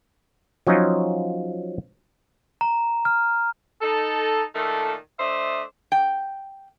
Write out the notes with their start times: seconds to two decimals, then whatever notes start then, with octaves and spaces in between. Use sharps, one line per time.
0.67 F3 F#3 C#4 D#4 F4
2.61 A#5
3.05 F6
3.82 D#4 A4
4.55 A#2 D#3 A3 A4
5.19 A3 D4 C5 D#5 E5
5.92 G5